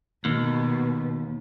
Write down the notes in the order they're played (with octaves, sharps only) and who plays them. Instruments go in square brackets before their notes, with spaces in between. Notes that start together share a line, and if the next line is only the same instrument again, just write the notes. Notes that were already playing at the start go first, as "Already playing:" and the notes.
[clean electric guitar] D#2 [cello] B2